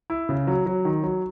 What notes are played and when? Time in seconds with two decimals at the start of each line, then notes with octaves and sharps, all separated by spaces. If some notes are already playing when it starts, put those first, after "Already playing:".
0.10 E4
0.29 C#3
0.47 F#3
0.66 F#3
0.85 D#3
1.03 F#3